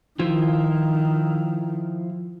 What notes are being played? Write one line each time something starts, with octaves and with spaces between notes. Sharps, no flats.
D#3 F3 E4 F4